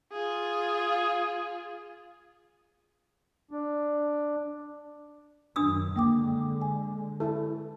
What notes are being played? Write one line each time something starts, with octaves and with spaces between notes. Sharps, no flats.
F4 G#4
D4
F#2 D#3 D4 D#6 E6
D3 G#3 A#3 G5 D6
G#5
E4 A4